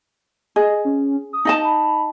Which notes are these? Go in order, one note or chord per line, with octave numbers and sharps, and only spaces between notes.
G#4 D#5
C#4
D#6
D#4 D#5 A5
B5